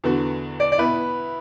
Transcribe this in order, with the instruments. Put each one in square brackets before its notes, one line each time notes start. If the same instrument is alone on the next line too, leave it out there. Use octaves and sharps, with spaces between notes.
[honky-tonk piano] E2 D3 B3 F#4
[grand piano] D5
D5
[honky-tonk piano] B2 B3 E4 [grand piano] B4